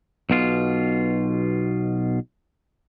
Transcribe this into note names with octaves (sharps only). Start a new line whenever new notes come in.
B1 B2 F4